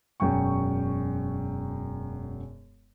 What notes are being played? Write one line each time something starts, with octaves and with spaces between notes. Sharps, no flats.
E1 F#2 G5 C#6